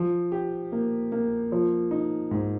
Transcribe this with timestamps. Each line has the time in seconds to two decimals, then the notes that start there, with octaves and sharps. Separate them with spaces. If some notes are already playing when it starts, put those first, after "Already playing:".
Already playing: F3
0.32 G4
0.72 A#3
1.12 A#3
1.52 F3
1.91 D#4
2.31 G#2